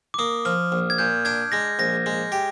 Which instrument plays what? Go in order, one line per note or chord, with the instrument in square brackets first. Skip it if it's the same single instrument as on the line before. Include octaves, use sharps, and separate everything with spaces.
[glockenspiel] D6
[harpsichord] A#3 [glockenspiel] D#6
[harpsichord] F3 [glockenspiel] F6
[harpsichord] A#1
[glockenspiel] G#6
[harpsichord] A#2 [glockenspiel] G6
[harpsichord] D4 [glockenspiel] G#6
[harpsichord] G#3 [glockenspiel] A#6
[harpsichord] A#1 [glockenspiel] A#6
[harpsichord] G#3
G4